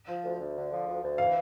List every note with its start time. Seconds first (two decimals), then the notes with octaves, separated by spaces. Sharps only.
0.08 F3
0.24 D2
0.40 D2
0.56 D3
0.71 F3
0.87 D2
1.03 D2
1.18 E3 F5